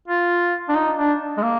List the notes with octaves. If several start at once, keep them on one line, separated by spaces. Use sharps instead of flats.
F4
D4
D#4
D4
G#3
A#3